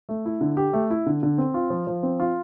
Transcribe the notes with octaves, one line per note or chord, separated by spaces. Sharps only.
A3
E4
D3
G4
A3
E4
D3
D3
C4
F4
F3
F3
C4
F4